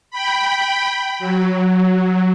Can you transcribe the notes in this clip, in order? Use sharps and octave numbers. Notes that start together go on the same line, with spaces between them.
G5 B5
F#3